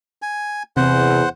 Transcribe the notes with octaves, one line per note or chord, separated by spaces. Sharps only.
G#5
E2 C3 C5 F#5